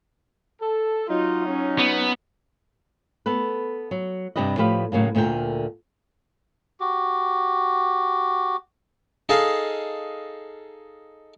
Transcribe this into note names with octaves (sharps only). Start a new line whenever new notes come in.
A4
F#3 D#4 F4
C#4
B3
B3 A4 B4
F#3
G2 C3 D4 G4 B4 D#5
A2 F3 G4 B4 F5
A2 C#3 F#3 A#3
D2 A#2 D3 A#4 G5
F#4 G4
D#4 G#4 A4 D#5 F5